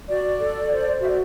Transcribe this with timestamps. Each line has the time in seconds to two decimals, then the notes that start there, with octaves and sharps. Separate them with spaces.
0.08 F#4 D5
0.39 A4
0.71 C5
1.00 F#4 E5
1.08 D5